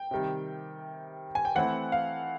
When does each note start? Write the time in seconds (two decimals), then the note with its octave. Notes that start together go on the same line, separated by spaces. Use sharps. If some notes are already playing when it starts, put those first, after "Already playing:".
Already playing: G5
0.11 C3 D#3 G3
1.35 G#5
1.45 G5
1.55 E3 A3 C4 E4 F#5
1.92 F5